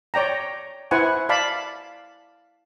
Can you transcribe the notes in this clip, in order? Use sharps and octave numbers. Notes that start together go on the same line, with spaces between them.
C#5 D5 G5 A#5
E4 B4 C5 F#5 G#5 C#6
D5 F5 A5 B5